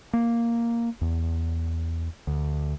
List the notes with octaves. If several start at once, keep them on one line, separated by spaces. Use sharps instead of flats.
A#3
E2
D2